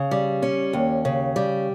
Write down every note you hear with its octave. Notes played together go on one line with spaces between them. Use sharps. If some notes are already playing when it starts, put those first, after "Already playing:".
Already playing: C#3
G3
C#4
D#2
C#3
G3